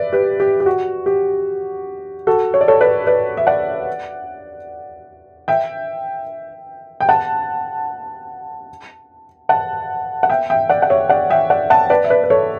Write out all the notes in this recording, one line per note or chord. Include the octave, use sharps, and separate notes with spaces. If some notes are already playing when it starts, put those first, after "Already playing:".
Already playing: B4 D5 E5
G4 B4
G4
G4
F#4
G4
F#4 A4
C#5
D5
A4 C#5
B4 D5
B4 D5
E5
D5 F#5
E5 G5
G5
F#5 A5
F#5 A5
F#5
E5 G5
E5 G5
D5 F#5
F#5
C#5 E5
D5 F#5
E5 G5
D5 F#5
F#5 A5
B4 D5
E5
B4 D5
B4
A4 C#5